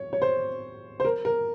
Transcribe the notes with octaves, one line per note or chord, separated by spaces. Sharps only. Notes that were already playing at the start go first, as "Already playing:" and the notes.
Already playing: C#5
C#5
C5
C5
A#4
A#4